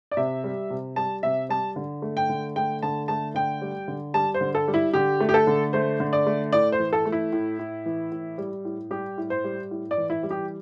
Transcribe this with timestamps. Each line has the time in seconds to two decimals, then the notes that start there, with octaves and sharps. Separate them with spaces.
0.11 D5
0.17 C3 E5
0.44 G3
0.70 C3
0.96 G3 A5
1.23 C3 E5
1.49 G3 A5
1.76 D3
2.02 A3
2.17 G5
2.29 D3
2.56 A3 G5
2.82 D3 A5
3.08 A3 A5
3.35 D3 G5
3.61 G3
3.88 D3
4.14 G3 A5
4.34 C5
4.41 D3
4.55 A4
4.68 G3
4.74 E4
4.94 D3 G4
5.20 A3
5.29 G4
5.34 A4
5.47 D3
5.73 A3 C5
6.00 D3
6.13 D5
6.27 A3
6.52 A2 D5
6.72 C5
6.79 E3
6.93 A4
7.05 A3
7.12 E4
7.32 A2
7.59 A2
7.86 E3
8.12 A2
8.38 G3
8.65 A2
8.91 G3 G4
9.18 A2
9.30 C5
9.44 G3
9.71 A2
9.91 D5
9.97 E3
10.10 E4
10.23 G3
10.31 G4